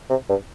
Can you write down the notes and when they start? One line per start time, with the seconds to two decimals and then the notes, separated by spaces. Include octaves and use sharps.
0.09 C3
0.29 G2